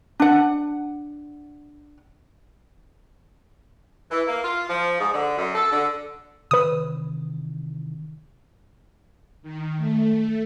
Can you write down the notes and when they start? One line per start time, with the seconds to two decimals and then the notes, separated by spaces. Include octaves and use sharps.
0.20 D4 F#5
4.10 E3
4.26 A#3
4.43 F4
4.69 F3
4.99 G#2
5.12 D3
5.37 F#2
5.55 A4
5.72 D3
6.51 C3 D#3 E3 B4 D#6
9.42 D#3
9.77 A3